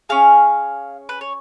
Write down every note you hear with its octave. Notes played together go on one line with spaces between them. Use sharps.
C#4 G#4 F5
B4
C#5